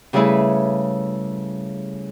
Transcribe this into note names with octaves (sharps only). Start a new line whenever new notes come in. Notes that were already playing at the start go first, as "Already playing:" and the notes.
C#3 G3 A3 E4 G#4 B4